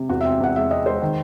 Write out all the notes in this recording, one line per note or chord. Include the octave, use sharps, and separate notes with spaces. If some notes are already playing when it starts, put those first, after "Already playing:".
Already playing: C3
E2 F#4
E5
C4
E5
E2 F#5
G#3 E5
C4 D#5
G#3 C5
D#3